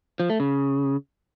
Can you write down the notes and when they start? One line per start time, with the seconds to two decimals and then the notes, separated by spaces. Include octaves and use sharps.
0.20 F3
0.30 A3
0.40 C#3